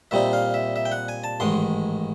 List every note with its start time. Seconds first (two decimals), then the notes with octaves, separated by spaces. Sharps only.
0.11 A#2 G3 C4 D#4 E5
0.33 F5
0.54 E5
0.76 E5
0.85 G5
0.92 F#5
1.09 G#5
1.24 A5
1.40 A1 G#2 D#3 G#3 C6